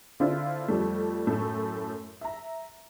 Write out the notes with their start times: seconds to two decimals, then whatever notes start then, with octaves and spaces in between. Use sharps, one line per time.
0.20 D3 C4 D4 E4 F4
0.68 F2 G3 A3
1.27 F#2 A2 A3
2.21 E5 A#5